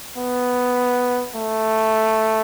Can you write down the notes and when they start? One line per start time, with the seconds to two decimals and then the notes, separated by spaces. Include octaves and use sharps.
0.18 B3
1.36 A3